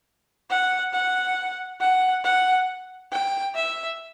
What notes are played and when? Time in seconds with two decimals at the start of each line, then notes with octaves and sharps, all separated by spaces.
0.50 F#5
0.93 F#5
1.80 F#5
2.24 F#5
3.12 G5
3.55 E5